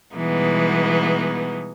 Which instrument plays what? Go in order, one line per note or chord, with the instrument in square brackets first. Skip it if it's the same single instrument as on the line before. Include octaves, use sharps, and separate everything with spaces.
[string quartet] B2 E3 G3 G#3 B3 D#4